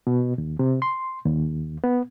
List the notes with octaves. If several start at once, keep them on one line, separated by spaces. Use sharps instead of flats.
B2
D#2
C3
C6
D#2
B3